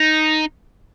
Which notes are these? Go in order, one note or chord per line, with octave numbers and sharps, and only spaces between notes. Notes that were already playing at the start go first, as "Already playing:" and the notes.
Already playing: D#4